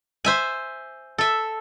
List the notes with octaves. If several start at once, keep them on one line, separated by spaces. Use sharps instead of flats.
C5 E5 G#5
A4 E5